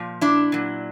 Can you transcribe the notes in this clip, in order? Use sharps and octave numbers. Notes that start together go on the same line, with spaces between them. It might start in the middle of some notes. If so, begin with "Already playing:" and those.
Already playing: A#2 F3
D4 E4
A#2 F#3